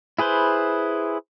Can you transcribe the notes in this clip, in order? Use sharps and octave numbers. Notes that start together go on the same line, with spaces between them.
E4 G#4 B4 C5